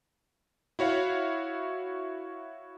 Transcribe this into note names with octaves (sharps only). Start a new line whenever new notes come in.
E4 F#4 C#5 F5